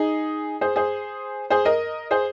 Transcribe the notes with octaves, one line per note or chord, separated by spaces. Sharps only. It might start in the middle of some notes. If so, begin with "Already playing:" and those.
Already playing: D#4 G#4
G#4 C5
G#4 C5
G#4 C5
A#4 D#5
G#4 C5